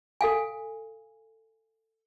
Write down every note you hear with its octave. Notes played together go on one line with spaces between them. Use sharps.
A4 F5 G#5